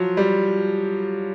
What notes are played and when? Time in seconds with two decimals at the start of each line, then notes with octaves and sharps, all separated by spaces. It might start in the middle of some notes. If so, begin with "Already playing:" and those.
Already playing: F3 F#3
0.17 G3